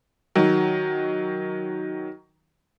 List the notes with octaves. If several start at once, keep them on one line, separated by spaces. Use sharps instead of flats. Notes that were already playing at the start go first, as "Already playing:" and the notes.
D#3 F#3